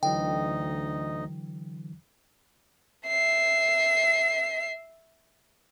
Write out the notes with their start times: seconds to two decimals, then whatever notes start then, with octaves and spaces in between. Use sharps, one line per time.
0.03 D2 D3 E3 F#3 D#4 D#5 G5
3.07 E5 C7